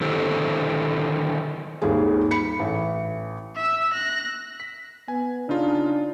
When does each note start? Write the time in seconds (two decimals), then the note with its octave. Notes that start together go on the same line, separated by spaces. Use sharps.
0.01 D3 D#3 E4 G4 A4 C5
1.82 D#1 G#1 G3 G#4
2.31 B5 C#7
2.59 A1
3.55 E5 E6
3.93 F#6 A#6
4.60 B6
5.08 B3 G#5
5.49 C#3 D4 D#4 F4